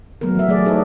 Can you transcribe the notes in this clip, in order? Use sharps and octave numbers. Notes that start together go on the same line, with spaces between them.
F#3 A3 B3 A#4
E3 E5
F#3 A3 G#4 D5
D#4 G#4 A4 B4 C#5 D#5